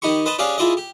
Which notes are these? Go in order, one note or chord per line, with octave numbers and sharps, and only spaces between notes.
D#3 D#4 G4 B5 C#6
B4 D#5 A5 B5 C6
C#4 D4 G4 G#4 D5 F5
E4 F4 G#4 D5 D#5
G4